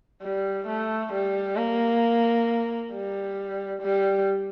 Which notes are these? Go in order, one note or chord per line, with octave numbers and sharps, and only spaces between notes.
G3
A3
G3
A#3
G3
G3